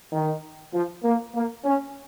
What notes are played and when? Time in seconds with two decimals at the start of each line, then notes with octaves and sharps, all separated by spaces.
0.12 D#3
0.73 F3
1.04 A#3
1.34 A#3
1.65 C#4